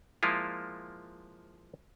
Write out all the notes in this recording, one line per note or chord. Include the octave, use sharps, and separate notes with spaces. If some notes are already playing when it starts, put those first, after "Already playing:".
F3 G#3 A#3 E4 F4